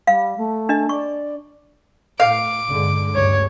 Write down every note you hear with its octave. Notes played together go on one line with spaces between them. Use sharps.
G3 F5
A3
D4 D#5
D5 C#6
A2 F5 D6
G2 D3 G#3
D2 G2 C#3 C#5